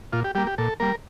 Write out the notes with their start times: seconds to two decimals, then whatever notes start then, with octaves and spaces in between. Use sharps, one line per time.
0.13 A#2 F4
0.24 G4
0.35 G3 A#3 G4
0.47 G4
0.58 A#2 A4
0.80 G3 A#3 A#4